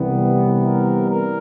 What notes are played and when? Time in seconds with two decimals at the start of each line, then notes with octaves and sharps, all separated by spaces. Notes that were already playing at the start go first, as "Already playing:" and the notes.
Already playing: C2 C3 E3 G3 B3
0.63 A#4
1.08 A#4